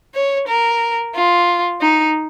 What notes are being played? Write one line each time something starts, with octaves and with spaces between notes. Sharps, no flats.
C#5
A#4
F4
D#4